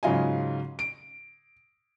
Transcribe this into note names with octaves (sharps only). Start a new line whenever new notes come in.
G#2 C#3 F#3 F4 D#5 G#5
D7